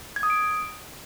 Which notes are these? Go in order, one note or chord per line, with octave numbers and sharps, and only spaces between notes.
G#6
D#6
D7